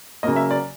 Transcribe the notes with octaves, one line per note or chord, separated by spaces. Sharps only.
C#3 F#3 A#3 D#5
E5
D5